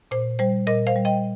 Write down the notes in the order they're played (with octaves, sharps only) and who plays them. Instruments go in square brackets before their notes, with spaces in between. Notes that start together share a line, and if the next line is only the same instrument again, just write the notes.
[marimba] A#2 C5
G3 C5
A#2 A#4 D#5
C5 F5
G3
D#5 G5